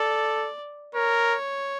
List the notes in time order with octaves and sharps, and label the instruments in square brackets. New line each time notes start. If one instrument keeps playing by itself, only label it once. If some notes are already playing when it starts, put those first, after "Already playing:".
Already playing: [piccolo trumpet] A4 [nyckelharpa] D5
[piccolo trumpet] A#4 [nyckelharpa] C#5